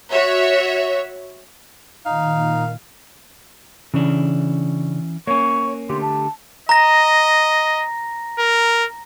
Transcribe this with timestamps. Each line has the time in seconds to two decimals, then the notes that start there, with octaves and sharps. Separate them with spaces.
0.11 F#4 C#5 E5
2.06 A#2 D#3 D#4 F5
3.94 C#3 E3 C#4 D4
5.27 A#3 C#4 C#5 C#6
5.89 D3 A3 G4 C6
6.01 A5
6.69 D#5 A#5 A#6
8.39 A#4